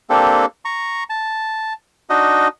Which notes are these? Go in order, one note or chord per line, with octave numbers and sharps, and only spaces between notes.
A#3 C4 D4 G4 A4
A#5 C#6
A5
D4 D#4 F#4 D#5